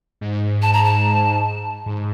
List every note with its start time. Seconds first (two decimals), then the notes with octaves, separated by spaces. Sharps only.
0.21 G#2
0.62 A5
0.73 A#5
0.84 A5
1.86 G#2